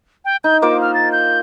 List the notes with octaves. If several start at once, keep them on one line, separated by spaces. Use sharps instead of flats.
G5
D#4 G6
A#3 F4 C5 D6
F6
A6
G6